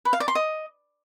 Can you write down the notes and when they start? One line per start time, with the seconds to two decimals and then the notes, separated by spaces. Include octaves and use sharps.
0.05 B4
0.13 F5
0.20 D5
0.28 C6
0.35 D#5